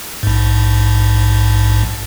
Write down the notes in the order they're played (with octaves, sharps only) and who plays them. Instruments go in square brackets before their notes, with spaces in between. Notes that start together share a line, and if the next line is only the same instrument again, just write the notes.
[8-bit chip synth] A#1 G#2